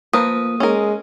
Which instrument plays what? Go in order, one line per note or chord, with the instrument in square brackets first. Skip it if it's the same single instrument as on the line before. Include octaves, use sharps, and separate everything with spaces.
[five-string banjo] F3 A#4 B4 [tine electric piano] A#3 [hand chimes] D#6
[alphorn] G#3 [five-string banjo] C#4 A#4